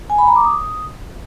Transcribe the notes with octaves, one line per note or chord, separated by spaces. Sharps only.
G#5
B5
A#5
D6
D#6